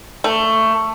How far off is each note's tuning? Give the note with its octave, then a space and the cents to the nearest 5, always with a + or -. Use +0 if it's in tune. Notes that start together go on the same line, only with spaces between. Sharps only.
A3 +15